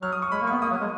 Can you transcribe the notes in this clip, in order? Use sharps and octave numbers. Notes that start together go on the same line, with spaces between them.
F#3 F6
D#6
C#6
G#3 B5
A#3
B3 C#6
A#3 D#6
F#3
G#3